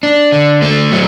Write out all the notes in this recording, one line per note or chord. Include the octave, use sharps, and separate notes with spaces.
D4
D3
A3
F#3